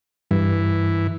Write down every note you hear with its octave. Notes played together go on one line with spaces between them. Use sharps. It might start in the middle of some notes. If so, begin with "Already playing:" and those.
G2 E3